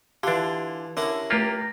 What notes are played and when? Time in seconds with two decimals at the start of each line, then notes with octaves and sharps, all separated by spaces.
0.23 D3 E3 D4 F4 G4
0.97 D3 C#4 E4 A#4
1.30 A3 A#3 F4 G4 A#6